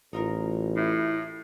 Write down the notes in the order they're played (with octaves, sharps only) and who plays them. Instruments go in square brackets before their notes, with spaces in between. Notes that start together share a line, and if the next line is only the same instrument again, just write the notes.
[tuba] A1 [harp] D#4 F4 A#4
[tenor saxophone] A2 [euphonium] E4